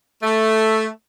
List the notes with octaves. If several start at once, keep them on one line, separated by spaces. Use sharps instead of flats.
A3